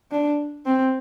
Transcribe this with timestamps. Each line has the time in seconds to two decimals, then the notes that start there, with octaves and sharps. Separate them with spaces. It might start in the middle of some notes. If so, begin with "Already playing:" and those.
0.11 D4
0.66 C4